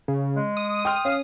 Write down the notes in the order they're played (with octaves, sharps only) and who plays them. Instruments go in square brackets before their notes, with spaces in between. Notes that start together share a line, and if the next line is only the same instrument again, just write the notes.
[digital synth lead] C#3
[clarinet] G#3
[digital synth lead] D#6
[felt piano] G5 C6 F6
[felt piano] C#4 [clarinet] F5